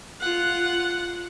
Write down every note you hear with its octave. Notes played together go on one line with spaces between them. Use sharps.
F4 F#5